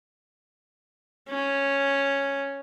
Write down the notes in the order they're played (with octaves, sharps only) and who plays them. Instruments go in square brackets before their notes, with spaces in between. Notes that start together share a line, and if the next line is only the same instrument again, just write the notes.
[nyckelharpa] C#4